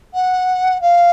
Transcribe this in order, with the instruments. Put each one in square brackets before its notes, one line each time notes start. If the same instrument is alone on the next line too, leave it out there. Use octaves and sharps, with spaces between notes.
[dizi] F#5
F5